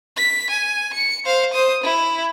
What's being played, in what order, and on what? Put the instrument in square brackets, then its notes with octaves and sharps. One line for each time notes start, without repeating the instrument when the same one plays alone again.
[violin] B6
G#5
C#7
C5 F5
C5 D#6
E4